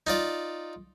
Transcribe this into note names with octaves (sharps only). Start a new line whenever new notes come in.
D#4 F4 D5